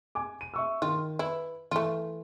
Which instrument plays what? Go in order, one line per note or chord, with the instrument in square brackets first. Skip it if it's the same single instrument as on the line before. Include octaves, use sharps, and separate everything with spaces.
[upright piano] G#5 D6
D#7
E5 C#6 E6
[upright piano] D#3 [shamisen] F4
[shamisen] E4 [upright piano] B4
[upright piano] E3 [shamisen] A3 F4